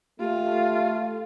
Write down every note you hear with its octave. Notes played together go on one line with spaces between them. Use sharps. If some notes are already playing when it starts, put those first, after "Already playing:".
A3 F4 G4